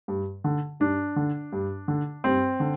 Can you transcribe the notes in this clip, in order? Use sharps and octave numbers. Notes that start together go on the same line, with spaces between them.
G2
D3
G2 D4
D3
G2
D3
G2 C4
D3